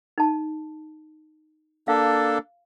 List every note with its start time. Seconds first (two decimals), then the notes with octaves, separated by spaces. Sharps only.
0.18 D#4 A5
1.88 A#3 D4 A4 F5